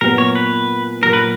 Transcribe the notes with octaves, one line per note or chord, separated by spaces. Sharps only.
A#2 F#3 B3 A#4
C#5
B4
A#2 F#3 A#3 A#4
B4